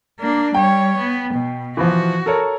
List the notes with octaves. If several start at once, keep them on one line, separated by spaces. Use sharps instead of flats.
A#3 D4
G3 C#5 G5
B3
B2
E3 F3 F#4
A4 A#4 C#5